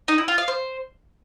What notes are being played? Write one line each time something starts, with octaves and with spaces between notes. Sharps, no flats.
D#4
E4
F4
F5
C5